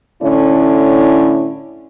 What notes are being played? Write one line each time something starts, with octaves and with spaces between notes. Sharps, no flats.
A2 D3 C#4 E4